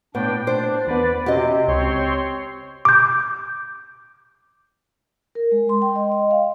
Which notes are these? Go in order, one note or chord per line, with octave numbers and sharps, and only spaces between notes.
A2 B3 D4 G5
D4 C5
E2 B3 B4 D5
C3 C#4 F#4 G4 D#5
C#2 C4 C#5 C6
D6 G6
A#4
G#3
C6
G5
D#5
D#5
F5